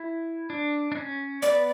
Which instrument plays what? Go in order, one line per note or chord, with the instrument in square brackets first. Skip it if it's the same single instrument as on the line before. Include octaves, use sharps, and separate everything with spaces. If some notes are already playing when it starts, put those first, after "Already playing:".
Already playing: [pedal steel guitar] E4
D4
D4
C#4
[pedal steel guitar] B3 [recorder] D5